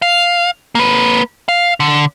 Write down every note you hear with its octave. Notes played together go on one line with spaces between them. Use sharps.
F5
A#3 B4
F5
D3